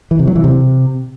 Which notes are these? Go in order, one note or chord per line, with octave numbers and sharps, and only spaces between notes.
E3
C3
F#3
E3
C3